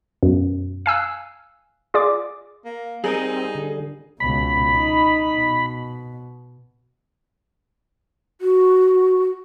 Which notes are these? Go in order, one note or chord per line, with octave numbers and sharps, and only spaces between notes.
F#2 B2
F5 G#5 E6 F#6
F4 G#4 D5 D6
A#3
G3 C4 D#4 G#4 A#4
D3
C#2 B2 B5
D#4
B2
F#4